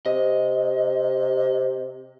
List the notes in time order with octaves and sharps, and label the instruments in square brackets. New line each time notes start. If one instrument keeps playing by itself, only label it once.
[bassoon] C3 [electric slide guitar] D#5